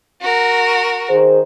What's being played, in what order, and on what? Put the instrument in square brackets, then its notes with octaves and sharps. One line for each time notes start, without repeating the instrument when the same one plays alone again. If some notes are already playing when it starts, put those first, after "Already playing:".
[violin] F#4 A#4
[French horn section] D#3 G#4 C5